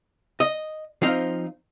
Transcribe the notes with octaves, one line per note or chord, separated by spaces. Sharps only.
D#5
F3 C4 D#4 F5